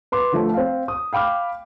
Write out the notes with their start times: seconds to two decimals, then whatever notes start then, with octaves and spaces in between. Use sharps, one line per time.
0.12 B4 C6 D6
0.32 D3 F3 A3
0.54 C4 F5
0.88 D#6
1.13 F5 G5 B5 D6 F6